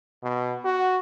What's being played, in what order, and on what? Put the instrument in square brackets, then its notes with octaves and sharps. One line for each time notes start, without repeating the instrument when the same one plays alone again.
[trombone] B2
F#4